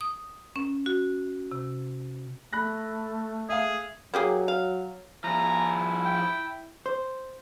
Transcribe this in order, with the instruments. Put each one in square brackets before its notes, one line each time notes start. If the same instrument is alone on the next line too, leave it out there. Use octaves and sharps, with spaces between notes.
[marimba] D#6
C#4
F#4
C3
[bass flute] A3 [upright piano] B5 F#6 A#6
[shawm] G#4 [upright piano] E5 F5
[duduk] F#3 [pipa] A#3 G4 G#4
[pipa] F5
[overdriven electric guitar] F3 G#4 [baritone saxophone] E4 [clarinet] A#5
[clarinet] G5
[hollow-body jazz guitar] C5